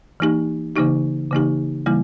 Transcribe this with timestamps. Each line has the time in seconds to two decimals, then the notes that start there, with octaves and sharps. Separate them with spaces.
0.20 E3 A#3 D#4 G4
0.76 C#3 E3 A#3 D#4 G4
1.31 C#3 E3 A#3 D#4 G4
1.86 C#3 E3 G3 A#3 E4